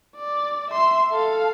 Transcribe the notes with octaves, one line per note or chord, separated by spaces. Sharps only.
D5
E5 C6
A4 F5